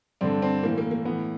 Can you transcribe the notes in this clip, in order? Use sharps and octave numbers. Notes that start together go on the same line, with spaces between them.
G2 D3 C4 D4
C4 D4
A2 E3 A#3
A#3
A#3
A2 E3 B3